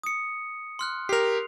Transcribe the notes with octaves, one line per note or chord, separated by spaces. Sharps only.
D#6 C#7
C6 F6 F#6
G4 A#4 C7 F7